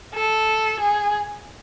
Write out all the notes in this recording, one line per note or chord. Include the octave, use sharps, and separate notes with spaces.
A4
G#4